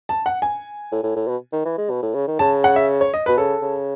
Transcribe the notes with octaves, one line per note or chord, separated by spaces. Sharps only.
A5
F#5
G#5
A2
A2
A2
B2
D#3
E3
G#3
B2
A2
C#3
D#3
C#3 A5
F#5
E5
C#5
D#5
B2 B4
C#3 A4
C#3